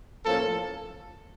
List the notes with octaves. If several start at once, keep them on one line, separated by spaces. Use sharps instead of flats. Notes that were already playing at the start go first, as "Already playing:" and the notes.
A2 F3 A#3 C#4 A4